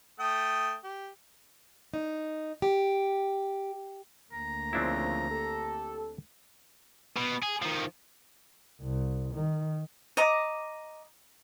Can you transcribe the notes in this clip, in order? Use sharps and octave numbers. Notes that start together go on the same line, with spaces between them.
A3 G5 D#6
G4
D#4
G4
D2 A#3 A#5
C#3 F3 C4 D4 E4
G4 A4
B2
G#4
D#3 F3
C2
D#3
D#5 A#5 D6